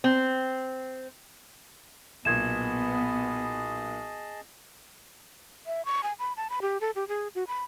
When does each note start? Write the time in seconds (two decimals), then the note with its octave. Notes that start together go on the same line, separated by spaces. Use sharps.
0.04 C4
2.25 B1 A#2 B3 G#4 D#5 A5 G#6 E7
5.66 E5
5.85 C#6
6.03 G#5
6.19 B5
6.37 A5
6.50 B5
6.62 G4
6.81 A4
6.96 G4
7.08 G#4
7.35 F#4
7.47 B5